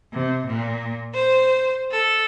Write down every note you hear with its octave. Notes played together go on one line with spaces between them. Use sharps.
C3
A#2
C5
A4